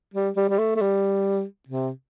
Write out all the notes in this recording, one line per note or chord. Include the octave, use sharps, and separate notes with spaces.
G3
G3
G3
A3
A3
G3
C3